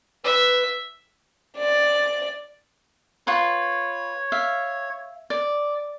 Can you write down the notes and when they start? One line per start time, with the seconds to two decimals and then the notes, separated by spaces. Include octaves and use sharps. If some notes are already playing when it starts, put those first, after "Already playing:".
0.24 B4 E5
1.58 D5
3.27 F4 B4 C#5 C#6
4.32 E5 F5
5.30 D5